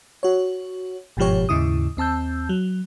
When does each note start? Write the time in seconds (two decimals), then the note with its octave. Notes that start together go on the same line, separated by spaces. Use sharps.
0.23 F#4 C#5
1.17 G1 G#2 B2 F3 G4 C#5
1.49 D#2 G#2 C#3 E4 D#6
1.97 D#2 C4 A5 E6 G6
2.49 F#3